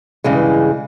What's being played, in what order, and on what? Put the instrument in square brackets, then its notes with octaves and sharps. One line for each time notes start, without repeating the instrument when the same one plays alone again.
[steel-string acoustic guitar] G2 C#3 E3 G#3